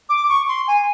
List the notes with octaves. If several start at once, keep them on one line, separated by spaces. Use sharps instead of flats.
D6
C#6
C6
G#5